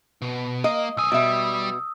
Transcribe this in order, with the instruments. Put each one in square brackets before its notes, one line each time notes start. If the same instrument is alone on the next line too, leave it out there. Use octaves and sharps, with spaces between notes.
[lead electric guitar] B2
[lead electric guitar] A#3 [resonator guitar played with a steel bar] D#5
[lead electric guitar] B1 G#5 [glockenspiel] D#6 E6
[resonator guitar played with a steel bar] B2 E5 [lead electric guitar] G3